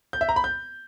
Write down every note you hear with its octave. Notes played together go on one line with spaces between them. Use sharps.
G6
E5
A#5
B5
G6